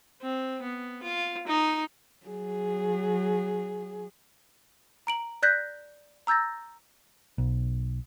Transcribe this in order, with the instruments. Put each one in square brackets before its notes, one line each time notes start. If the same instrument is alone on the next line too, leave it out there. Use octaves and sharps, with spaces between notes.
[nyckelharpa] C4
B3
F4
D#4
[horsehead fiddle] F#3 G#4
[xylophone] A#5 D7 F#7
D5 F#6 G6 A#6 B6
A#5 E6 G6 A6 A#6
[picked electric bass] B1